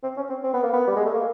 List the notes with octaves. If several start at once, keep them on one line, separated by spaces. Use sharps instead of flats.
C4
C#4
C4
C4
B3
A#3
B3
G3
G#3
A3
A#3